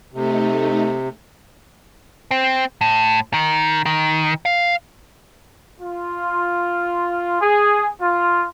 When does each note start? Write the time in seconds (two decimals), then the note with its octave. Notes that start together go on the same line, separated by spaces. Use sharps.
0.14 C3 A3 D#4
2.31 C4
2.81 A2
3.34 D#3
3.86 D#3
4.45 F5
5.81 F4
7.41 G#4
8.01 F4